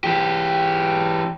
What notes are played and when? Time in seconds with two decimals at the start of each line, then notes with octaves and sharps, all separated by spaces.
0.04 E3 G4